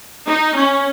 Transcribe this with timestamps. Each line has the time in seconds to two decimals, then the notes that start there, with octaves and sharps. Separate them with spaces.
0.26 D#4
0.55 C#4